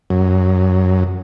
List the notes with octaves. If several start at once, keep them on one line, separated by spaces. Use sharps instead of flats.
F#2